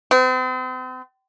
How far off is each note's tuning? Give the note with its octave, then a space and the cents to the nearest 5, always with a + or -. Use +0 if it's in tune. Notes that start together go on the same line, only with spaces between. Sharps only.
C4 -40